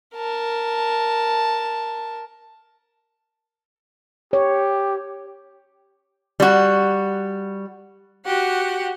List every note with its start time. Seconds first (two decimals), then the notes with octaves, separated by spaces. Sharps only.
0.15 A#4 A5
4.33 G4 C#5
6.40 G3 F#4
8.25 F#4 G4 F#5